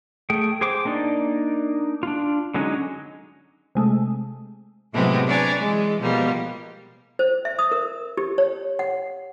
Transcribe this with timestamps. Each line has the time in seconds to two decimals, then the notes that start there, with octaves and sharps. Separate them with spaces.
0.30 A3 G#4 G5
0.61 G#4 C5 G5 D6
0.85 A#3 D4 D#4 D5
2.03 D4 F4
2.54 D3 F#3 G#3 C#4 D#4
3.75 C3 G#3 A3
4.92 A2 C3 F#3 G#3 A3 B3
5.27 D4 B4 C#5 D5 G#5 A#5
5.59 E3 G#3
6.00 B2 F3 G3 G#3 A#3
7.19 C5
7.45 E5
7.59 D#6
7.72 A#4
8.17 G4
8.38 C#5
8.79 F#5